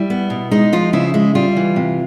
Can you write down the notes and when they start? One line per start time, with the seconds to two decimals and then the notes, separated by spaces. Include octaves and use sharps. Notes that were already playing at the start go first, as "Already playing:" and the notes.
Already playing: G3 E4
0.10 B3
0.30 B2
0.51 G#3 D#4
0.73 F3 F4
0.93 C#3 E4
1.14 G#3 E4
1.35 G3 F4
1.56 E3
1.76 C3